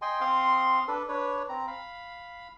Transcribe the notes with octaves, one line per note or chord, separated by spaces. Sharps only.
D#5 G5 G#5 C6
C4 F5 C6 D#6
D4 A4 B4
D4 B4 C#5
C4 A#5
F5 B5